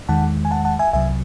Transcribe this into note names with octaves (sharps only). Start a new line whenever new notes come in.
E2 D#3 G#3 F#5 A5
G#5
F#5 A5
F#5 A5
E5 G#5
C2 C3 F#3 E5 G#5